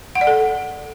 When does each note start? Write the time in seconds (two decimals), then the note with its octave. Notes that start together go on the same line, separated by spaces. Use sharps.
0.15 F#5
0.21 D5
0.27 A4